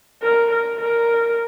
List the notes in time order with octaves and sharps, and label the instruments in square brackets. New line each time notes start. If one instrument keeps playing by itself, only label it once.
[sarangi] A#4
A#4
A#4